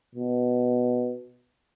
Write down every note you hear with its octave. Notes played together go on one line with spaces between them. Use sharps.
B2